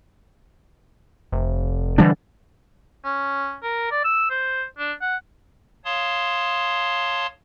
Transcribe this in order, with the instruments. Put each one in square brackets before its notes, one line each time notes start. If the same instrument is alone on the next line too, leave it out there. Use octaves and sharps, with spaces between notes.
[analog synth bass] F1
[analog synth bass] D3 [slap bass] E3 G3 D4
[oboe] C#4
A#4
D5
E6
C5
D4
F#5
[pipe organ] C#5 F5 A5 C6 D#6